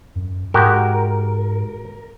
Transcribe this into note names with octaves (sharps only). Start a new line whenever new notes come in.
F#2
G#2 G#3 F#4 G4 A#4